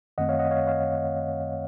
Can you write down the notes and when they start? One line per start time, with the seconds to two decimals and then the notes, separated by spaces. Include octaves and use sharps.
0.18 F#2 D#3 A3 C4 D#5 F#5
0.29 C#5 F5
0.39 D#5 F#5
0.51 C#5 F5
0.67 C#5 F5